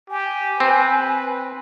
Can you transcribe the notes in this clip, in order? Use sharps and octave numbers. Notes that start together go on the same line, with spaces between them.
G4 G#5
C4 B4